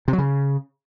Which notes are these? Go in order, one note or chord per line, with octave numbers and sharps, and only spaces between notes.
C3
F#3
C#3